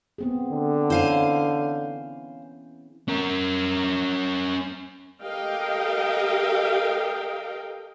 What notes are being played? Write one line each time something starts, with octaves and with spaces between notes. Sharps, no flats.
B3 C4 G#4
D3
E3 C#4 E4 C5 F5 G#5
C#4 A#4
G4 A4 A#4 D#5 F5 G5